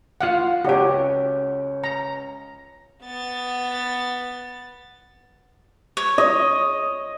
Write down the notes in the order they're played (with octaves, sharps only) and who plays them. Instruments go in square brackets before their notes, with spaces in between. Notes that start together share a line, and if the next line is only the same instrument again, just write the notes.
[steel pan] F4 F5 F#5
[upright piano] C#2 C#4 [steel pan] F#4 G4
[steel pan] A#5
[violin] B3 A6
[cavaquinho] C#5
[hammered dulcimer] D#5